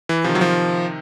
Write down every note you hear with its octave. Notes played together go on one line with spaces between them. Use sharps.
E3
C3 D#3 F3
F#3
F3